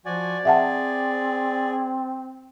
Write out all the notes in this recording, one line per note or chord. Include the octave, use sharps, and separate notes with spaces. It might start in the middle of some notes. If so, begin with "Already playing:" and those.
F3 F#4 D5 G#5
C4 G#4 E5 F#5 A5